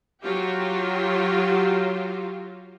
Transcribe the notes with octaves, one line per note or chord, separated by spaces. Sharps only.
F#3 F4 G4